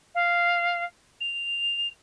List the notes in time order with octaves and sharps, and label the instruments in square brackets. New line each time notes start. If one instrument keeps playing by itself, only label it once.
[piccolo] F5
F7